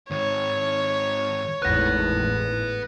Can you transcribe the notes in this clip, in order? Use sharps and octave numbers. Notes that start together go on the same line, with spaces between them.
G#2 D#3 C#5
G#1 E2 A2 B4 F#5 F#6 A#6